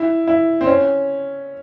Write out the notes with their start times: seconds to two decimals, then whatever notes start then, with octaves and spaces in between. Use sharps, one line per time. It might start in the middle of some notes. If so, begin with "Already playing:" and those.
Already playing: E4
0.27 E4
0.61 C4
0.67 C#4